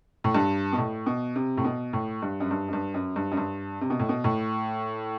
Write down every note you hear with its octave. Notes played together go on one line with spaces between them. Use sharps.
A2
G2
B2
A2
B2
C3
A2
B2
A2
G2
F#2
G2
F#2
G2
F#2
G2
F#2
G2
C3
B2
A2
B2
A2